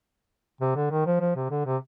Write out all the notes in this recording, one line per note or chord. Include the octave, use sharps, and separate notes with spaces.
C3
D3
D#3
F3
F3
C3
D3
C3